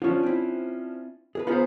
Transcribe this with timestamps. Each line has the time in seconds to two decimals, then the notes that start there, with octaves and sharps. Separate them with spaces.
0.02 F3 C#4 D4 F4 C#5
0.23 C4 E4
1.35 G#4 A#4 B4
1.47 B3 F4 G#4 B4 C5 A#5